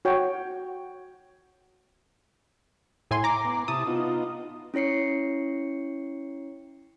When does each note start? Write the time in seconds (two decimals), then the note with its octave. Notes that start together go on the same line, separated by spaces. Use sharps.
0.05 F#4 C#5 G5
3.11 A2 G#5 C6
3.24 A#5 D6
3.45 B3
3.68 C3 E4 A5 D#6
3.87 B3 D#4 F4
4.74 C#4 E4 C#5 C7 C#7